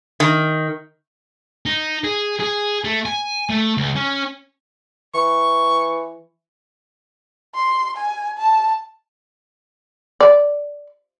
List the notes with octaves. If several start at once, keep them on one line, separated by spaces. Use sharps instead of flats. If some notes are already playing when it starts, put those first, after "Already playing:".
D#3
D#4
G#4
G#4
A3
G#5
A3
C#2
C#4
E3 C#6
C6
G#5
A5
D5